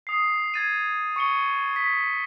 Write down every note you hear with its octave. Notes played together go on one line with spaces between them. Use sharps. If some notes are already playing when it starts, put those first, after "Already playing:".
D#6 C7
G#6 A6 D#7
C#6 C#7 G7
B6